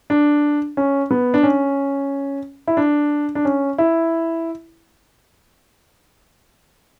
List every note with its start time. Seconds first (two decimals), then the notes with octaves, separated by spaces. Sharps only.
0.10 D4
0.77 C#4
1.11 B3
1.34 D4
1.43 C#4
2.68 E4
2.77 D4
3.35 D4
3.45 C#4
3.78 E4